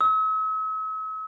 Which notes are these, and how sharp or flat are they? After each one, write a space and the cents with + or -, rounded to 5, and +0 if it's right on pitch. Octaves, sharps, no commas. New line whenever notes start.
E6 -45